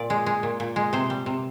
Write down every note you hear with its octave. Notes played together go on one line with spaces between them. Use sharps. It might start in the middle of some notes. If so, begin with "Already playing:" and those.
Already playing: A#2 D5
G#3
G#3
A#2
A#2
G#3
C3 C5
G3
C3